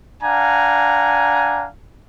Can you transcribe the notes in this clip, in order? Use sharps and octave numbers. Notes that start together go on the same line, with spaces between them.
D4 F5 F#5 G#5 A#5